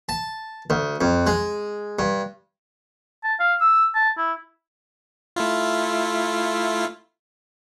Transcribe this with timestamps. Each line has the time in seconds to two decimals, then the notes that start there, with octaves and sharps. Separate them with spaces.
0.09 A5
0.70 D2
1.01 F2
1.27 G#3
1.99 G2
3.24 A5
3.40 F5
3.61 E6
3.95 A5
4.18 E4
5.36 A3 E4 F4